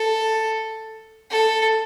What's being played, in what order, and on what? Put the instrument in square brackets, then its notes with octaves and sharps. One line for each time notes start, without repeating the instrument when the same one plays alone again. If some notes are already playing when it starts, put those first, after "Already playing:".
Already playing: [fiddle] A4
A4